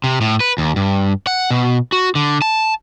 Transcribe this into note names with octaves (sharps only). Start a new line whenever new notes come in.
C3
A2
B4
D#2
G2
F#5
B2
F#4
D3
A5